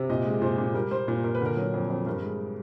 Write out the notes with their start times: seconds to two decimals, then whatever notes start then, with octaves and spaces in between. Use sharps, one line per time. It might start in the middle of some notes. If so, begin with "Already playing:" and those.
Already playing: C3
0.09 A#2 D#5
0.25 G#3
0.42 A#2 C5
0.58 A#2
0.74 G3 A#4
0.91 G3 C5
1.08 A#2 C5
1.24 A#2 A#4
1.35 B4
1.41 D3 A#4
1.57 F#3
1.74 F2
1.90 F2
2.06 G2 A#4
2.22 G#3